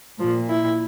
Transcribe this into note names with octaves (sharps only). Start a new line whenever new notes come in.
A#2 F3
E4